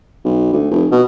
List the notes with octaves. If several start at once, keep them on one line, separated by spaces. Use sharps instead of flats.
B1
D2
F1
B2